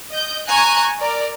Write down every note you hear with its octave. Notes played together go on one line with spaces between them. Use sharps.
D#5 G6
G#5 A#5 C#6 F#6
A#4 D5